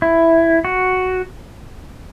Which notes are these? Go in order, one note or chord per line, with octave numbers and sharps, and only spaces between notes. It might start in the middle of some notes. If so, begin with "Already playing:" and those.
E4
F#4